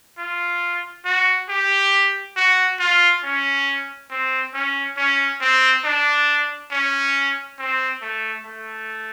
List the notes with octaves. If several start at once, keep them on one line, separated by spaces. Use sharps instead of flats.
F4
F#4
G4
F#4
F4
C#4
C4
C#4
C#4
C4
D4
C#4
C4
A3
A3